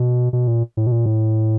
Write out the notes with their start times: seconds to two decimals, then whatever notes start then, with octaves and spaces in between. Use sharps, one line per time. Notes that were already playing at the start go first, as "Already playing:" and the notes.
Already playing: B2
0.33 B2
0.47 A#2
0.77 A2
0.87 B2
0.92 A#2
1.06 A2